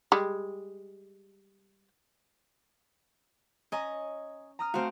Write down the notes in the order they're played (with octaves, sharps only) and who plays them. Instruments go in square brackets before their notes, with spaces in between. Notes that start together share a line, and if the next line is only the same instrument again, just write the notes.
[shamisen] G3 G#3
[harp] C#4 [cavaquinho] D#5 G#5 A#5
[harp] A#5 D#6 F6
[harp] A3 C4 F#4 [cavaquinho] C5 F5